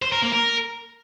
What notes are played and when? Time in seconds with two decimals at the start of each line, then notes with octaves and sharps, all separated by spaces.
0.02 C5
0.12 A#4
0.22 A#3
0.33 A#4